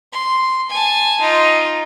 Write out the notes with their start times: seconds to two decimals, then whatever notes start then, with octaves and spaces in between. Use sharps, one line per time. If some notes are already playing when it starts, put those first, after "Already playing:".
0.13 C6
0.70 G#5 A5
1.20 D#4 F4